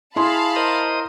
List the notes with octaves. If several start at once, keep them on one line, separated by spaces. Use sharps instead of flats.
E4 G#4 F5 A5 B5 C6
A#4 C5 D#5 D#6